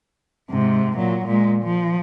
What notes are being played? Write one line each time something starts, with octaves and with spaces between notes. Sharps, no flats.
G#2 C3
A#2 F#3
A#2 G#3
F3